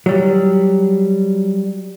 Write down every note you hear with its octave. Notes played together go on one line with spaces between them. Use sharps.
F#3 G3